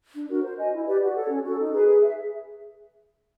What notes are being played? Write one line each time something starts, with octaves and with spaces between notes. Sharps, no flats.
D4
F#4 A#4
C5
D#5 G#5
E4
G4 B4 D5
F#4
A4 C#5
C#4
F#4 A4
D#4
G#4 B4
G#4
E5